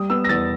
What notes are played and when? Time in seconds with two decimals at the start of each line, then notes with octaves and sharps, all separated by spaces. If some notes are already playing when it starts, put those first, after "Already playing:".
Already playing: G3 D#6
0.10 B3 E6
0.24 A#6
0.29 E2 A6